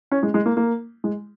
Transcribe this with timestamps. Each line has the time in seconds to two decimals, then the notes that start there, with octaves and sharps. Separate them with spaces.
0.12 C#4
0.23 G#3
0.34 G#3
0.46 A#3
0.57 A#3
1.04 G#3